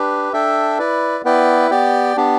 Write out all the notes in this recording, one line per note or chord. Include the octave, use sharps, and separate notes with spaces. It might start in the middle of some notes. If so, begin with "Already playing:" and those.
Already playing: D4 G4 B4
D4 A4 E5 G5
E4 B4 D5
B3 E4 B4 D5 G5
B3 G4 D5 G5
B3 D4 G4